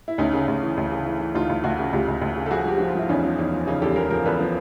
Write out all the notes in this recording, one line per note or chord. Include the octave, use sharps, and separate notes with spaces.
E4
D2 C#4 D#4
C#3
D2
E3
D2
C#3
E3
E3
D2 D#4 F4
D2
D2 E4 F#4
C#3
D2 F4 G4
D2
D2
C#3
A4
F3 F#4 G#4
F3 G4
F3 F#4
F4
F3 E4
E2 C#4 D#4
F3
E2 C#4 D#4
F3
C#3 C#4 D#4
E2 G4 A4
E2 G#4 A#4
F3 G#4 A#4
E2 A4 B4
F3